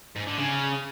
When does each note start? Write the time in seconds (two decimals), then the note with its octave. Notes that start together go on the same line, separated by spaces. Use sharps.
0.16 G#2
0.27 D3
0.38 C#3